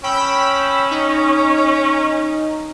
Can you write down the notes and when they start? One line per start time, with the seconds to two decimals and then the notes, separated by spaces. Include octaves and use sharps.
0.03 C#4 G5 B5 E6
0.91 D#4